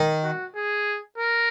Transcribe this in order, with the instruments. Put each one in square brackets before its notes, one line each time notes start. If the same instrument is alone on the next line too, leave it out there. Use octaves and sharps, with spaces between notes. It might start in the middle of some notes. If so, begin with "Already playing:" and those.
Already playing: [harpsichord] D#3
[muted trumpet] F#4
G#4
A#4